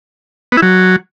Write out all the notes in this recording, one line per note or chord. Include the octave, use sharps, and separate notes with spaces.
B3
E4
F#3